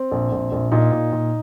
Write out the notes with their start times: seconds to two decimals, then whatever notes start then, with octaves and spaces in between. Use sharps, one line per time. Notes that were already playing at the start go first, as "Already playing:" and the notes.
Already playing: C4
0.12 A#1
0.32 A#1
0.52 A#1
0.72 A#2 D#4
0.92 A#2
1.12 A#2